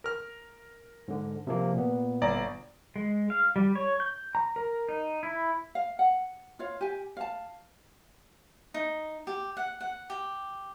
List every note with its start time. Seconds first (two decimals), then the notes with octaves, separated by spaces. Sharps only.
0.04 A#4 F6
1.08 G#2 D3
1.47 C3 F3 A#3
1.73 A#2 B3
2.21 G1 D5 A#5
2.96 G#3
3.30 F5
3.56 G3
3.75 C#5
4.00 G6
4.35 A#5
4.56 A#4
4.89 D#4
5.23 E4
5.75 F5
5.99 F#5
6.59 F4 C#5 F5
6.81 G4 G#5
7.17 F5 A5
8.74 D#4
9.27 G4
9.57 F#5
9.81 F#5
10.10 G4